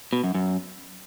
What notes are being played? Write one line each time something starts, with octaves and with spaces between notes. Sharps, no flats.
B2
F#2
F#2